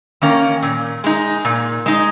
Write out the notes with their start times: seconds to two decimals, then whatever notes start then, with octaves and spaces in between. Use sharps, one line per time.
0.22 D#3 A#3 C#4 A#4
0.63 A#2
1.04 G#3 D#4
1.45 A#2
1.86 G#3 D#4